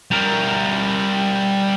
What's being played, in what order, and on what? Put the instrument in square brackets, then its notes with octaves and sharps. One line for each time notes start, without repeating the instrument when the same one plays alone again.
[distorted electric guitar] G3 A#4